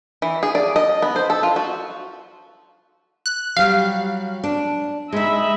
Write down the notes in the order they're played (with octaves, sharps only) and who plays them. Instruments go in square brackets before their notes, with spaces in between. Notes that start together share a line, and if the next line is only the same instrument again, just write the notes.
[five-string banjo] E3
G#4
D5
D#5
B3
C5
A4
F4
F#4
[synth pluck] F#6
[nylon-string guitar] F#3 G3 [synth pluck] F5
[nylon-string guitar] D4
[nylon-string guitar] G#3 D#4 [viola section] D#5 E5 B5